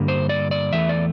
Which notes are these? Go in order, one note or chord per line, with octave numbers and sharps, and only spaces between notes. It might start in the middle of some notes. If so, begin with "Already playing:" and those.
Already playing: G2 D3 G3 A#3
C5
D5
D5
E2 E3 A3 E5
D5